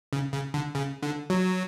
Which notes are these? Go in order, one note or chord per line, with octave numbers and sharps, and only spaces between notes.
C#3
C#3
D3
C#3
D3
F#3